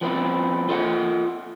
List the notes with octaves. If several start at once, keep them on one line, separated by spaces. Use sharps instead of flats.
F3 B3 C4 E4
F4 A4 D#5 F#5